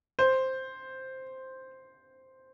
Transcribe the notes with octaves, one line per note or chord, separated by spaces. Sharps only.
C5